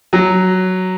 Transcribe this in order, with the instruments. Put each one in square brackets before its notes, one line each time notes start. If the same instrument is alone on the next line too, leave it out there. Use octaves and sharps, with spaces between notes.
[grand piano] F#3